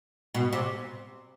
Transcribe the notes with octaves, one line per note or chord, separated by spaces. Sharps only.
B2
C3